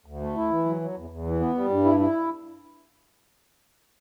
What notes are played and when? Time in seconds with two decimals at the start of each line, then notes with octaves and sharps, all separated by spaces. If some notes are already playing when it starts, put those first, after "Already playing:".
0.06 D2
0.21 A3
0.36 E4
0.51 E3
0.65 F#3
0.81 F#3
0.96 E2
1.10 E2
1.25 E3
1.40 B3
1.55 G3
1.70 G2
1.84 E4
1.99 E4